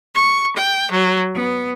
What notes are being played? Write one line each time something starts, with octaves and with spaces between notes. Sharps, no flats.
C#6
G5
F#3
B3